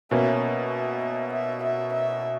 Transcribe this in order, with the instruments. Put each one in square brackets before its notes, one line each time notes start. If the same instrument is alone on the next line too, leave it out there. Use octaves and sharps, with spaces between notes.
[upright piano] B2 A#3 C#4 [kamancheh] E5
[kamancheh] E5
E5
E5
E5